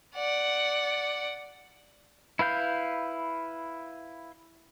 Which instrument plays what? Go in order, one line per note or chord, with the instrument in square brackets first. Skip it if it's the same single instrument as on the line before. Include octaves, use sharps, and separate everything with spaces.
[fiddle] D5 F#5
[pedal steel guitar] E4 B4 F5 G6